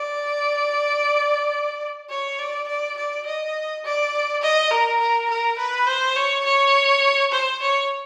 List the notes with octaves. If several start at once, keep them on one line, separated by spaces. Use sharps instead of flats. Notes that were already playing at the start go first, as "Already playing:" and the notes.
Already playing: D5
C#5
D5
D5
D5
D#5
D5
D#5
A#4
A#4
A#4
B4
C5
C#5
C#5
C5
C#5